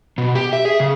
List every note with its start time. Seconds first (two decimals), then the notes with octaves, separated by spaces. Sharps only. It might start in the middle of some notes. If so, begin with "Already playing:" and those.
0.18 B2
0.35 G4
0.53 E5
0.65 G#4
0.80 C#3